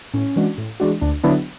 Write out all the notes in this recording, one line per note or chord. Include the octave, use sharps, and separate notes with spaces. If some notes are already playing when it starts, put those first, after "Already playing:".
A2 C#4
E3 G#3 D4 F#4
A2
E3 G#3 D4 F#4
D2 D4
D3 F#3 B3 D4 E4